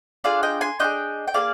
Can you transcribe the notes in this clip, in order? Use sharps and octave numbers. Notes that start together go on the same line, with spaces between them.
D4 F4 G#4 D5 F5
D#5 G5
G#5 C6
D4 F4 G#4 D#5 G5
G5
A#3 F4 G#4 D5 F5